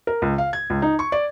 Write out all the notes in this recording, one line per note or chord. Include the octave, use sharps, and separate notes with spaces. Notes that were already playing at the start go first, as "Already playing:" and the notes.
A#4
C#2
F5
G#6
C#2
D#4
C#6
D5